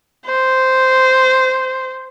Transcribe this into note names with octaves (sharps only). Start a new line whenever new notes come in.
C5